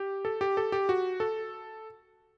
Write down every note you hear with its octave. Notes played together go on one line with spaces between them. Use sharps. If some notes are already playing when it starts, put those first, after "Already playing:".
Already playing: G4
A4
G4
A4
G4
F#4
A4